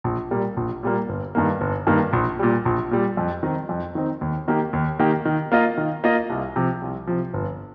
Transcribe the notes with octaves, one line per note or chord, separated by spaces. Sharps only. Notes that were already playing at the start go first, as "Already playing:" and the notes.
A#1
A#2 G3 A#3
A#1
A#2 G3 A#3
G1
G2 D#3 A#3
G1
G2 D#3 A#3
A#1
A#2 G3
A#1
A#2 G3
F2
D#3 C4 D#4
F2
D#3 C4 D#4
D#2
D#3 A#3 G4
D#2
D#3 A#3 G4
D#3
A#3 F4 D#5
D#3
A#3 F4 D#5
C2
C3 F3
C2
C3 F3
G1